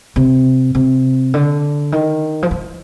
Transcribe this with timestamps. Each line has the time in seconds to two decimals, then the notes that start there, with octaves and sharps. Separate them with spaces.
0.16 C3
0.75 C3
1.34 D3
1.92 D#3
2.43 F3
2.51 E3